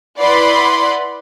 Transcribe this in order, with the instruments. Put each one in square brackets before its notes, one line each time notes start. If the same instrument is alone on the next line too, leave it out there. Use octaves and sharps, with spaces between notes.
[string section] E4 B4 D5 F#5 B5 C6